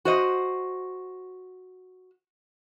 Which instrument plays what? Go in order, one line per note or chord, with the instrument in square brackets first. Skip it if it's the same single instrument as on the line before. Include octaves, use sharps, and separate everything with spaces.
[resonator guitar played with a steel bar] F#4 C5 D#5